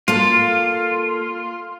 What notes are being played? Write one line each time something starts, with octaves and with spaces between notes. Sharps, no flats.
A#3 F4 A4